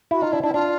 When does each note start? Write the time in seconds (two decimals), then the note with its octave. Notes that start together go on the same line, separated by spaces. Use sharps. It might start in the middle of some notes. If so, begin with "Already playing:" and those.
0.11 E4 F#4
0.22 D#4 F4
0.32 D4 E4
0.43 D4 E4
0.54 D4 F4